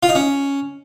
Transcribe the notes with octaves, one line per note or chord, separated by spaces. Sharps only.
F4
D#4
C#4